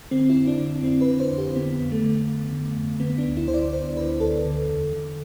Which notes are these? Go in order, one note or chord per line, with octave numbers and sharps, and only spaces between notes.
D3 C4
E4
F2
D4
D3
F2 C4
B4
D3
C5
F2
G4
D3 B3
F2
A3
D3
F2
D3
F2
D3 B3
D4
D2
E4
D3 C5
D5
D2 C5
D3 B4
D2 A4
D3
E2
D3